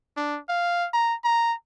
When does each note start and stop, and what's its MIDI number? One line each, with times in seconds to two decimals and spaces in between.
0.17 0.39 62
0.49 0.88 77
0.93 1.15 82
1.24 1.54 82